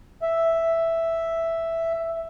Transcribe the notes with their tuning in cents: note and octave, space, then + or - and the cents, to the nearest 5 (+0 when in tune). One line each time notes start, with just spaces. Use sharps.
E5 +0